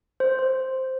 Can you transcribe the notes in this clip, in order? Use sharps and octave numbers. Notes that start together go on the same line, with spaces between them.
C5
C5